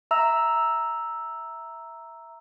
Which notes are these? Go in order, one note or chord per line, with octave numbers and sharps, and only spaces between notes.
E5 A#5 E6